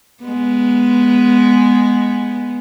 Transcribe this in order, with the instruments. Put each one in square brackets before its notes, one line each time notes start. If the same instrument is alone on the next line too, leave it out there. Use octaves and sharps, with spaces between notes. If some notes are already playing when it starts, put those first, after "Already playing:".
[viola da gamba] G#3 B3